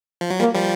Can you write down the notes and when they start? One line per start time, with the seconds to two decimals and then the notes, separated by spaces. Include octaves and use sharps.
0.21 F3
0.31 F#3
0.39 F3 G3 A#3
0.54 F3 G3